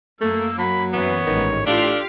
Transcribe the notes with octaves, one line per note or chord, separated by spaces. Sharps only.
F#2 A3 A#3 E6
F#3 B5
F#2 E3 B3 C#5
A1 G#2 D#3
A2 D4 F4 G4 A4 F5